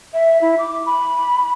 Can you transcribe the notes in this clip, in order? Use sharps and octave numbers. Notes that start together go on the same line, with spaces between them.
E5
E4
D6
B5